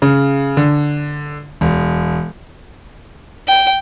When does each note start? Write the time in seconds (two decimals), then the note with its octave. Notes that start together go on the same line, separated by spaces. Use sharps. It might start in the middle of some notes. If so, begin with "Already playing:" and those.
0.02 C#3
0.57 D3
1.61 E1
3.48 G5